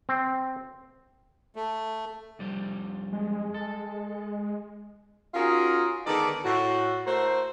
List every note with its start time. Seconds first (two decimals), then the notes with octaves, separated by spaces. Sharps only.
0.09 C4
1.56 A3
2.39 F2 G3 C5
3.13 G#3
3.54 A4
5.34 C#4 D#4 F4 F#4 G#4 A#4
6.06 D3 D#3 G#3 B3 A4 D5
6.44 A2 F#4
7.06 A3 F#4 A#4 C5